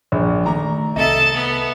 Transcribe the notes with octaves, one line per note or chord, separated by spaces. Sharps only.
A#1
D#3 A3 D5 A#5
C2 C3 A4 D#5 E5 A5 D#6
B3